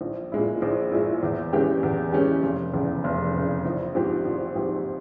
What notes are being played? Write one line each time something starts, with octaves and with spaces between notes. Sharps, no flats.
A#1
A#2 G#3 E4
A#1
A#2 G#3 E4
E2
E3 G#3 C#4 G4
E2
E3 G#3 C#4 G4
F1
E2 C#3
F1
E2 C#3
A#1
G#2 F3 C4 G4
A#1
G#2 F3 C4 G4